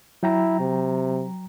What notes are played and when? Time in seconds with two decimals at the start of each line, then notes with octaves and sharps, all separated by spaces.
0.23 F#3 E4 G5 A#5
0.60 C3